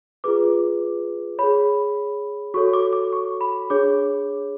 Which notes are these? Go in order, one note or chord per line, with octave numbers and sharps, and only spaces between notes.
F4 G#4 B4 D6
G#4 C#5 B5
F#4 A4 C#5 C#6
D6
D6
C#6
B5
D4 G#4 C#5 D6